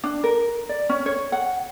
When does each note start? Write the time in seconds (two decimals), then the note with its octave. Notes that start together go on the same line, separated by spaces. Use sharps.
0.04 D4
0.24 A#4
0.69 D5
0.89 C#4
1.06 C#5
1.32 F#5